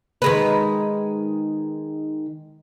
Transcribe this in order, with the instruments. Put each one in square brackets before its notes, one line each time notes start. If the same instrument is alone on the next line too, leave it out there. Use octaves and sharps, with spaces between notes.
[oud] D#3 G#3 B4